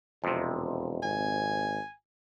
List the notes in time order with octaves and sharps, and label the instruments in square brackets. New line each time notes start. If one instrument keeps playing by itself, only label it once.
[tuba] E1 [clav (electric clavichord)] F2 C3
[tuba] G#1 [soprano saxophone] G#5